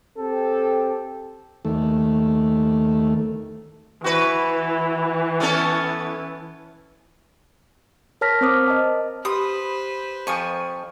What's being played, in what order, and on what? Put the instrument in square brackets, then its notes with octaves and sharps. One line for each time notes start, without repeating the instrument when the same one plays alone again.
[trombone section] C4 G4 A4
[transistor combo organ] D#2 A3
[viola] E3 [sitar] F#4 B4
[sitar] B3 C#4 A4
[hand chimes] A#4 C#5 A5 F6 A#6 B6
C4 A#4 C5 D6 D#6 F6
D#5 A5
[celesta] G4 B5 C6 [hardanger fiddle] B4 C5 [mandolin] D#6
[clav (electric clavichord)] F2 F3 [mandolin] G#5 C#6